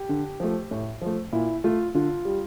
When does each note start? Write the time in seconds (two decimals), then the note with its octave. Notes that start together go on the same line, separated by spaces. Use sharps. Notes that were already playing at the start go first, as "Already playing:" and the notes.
Already playing: G4
0.09 D3
0.40 F3 A3
0.71 A2
1.01 F3 A3
1.32 A#2 E4
1.64 A3 F4
1.94 D3 F4
2.25 G3